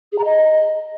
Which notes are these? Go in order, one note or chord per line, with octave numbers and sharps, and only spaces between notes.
G#4
A#5
D#5